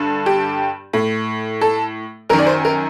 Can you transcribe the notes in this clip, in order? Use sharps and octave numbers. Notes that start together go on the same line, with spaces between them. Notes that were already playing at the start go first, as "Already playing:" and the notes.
Already playing: G2 D3
G4
A2
A4
F#2 D#3 A#4
D5
C5
A#4